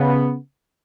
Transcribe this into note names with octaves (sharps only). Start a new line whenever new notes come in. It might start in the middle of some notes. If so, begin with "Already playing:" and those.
Already playing: C#3 B3